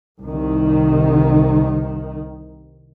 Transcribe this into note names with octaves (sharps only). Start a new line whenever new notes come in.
C2 D#3